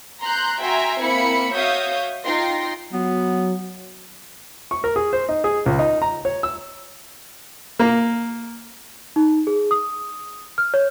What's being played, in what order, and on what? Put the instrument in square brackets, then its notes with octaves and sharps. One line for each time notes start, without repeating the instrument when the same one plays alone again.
[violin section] A#5 C6 F#6 G6
F#4 E5 G5 G#5 A#5 C6
A#3 C4 E4 B5 C#7
F#4 C#5 E5 F5 D#6 G6
D#4 F4 G5 C6 A#6 C7
[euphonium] F#3 [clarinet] B3
[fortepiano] C#6
A#4
G#4
C5
D#4
G#4
C#2
D#4
A#5
C#5
E6
A#3
[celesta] D#4
G#4
D#6
F6
C#5